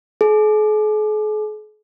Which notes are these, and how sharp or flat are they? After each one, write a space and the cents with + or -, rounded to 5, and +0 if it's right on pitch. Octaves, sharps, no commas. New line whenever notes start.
G#4 +45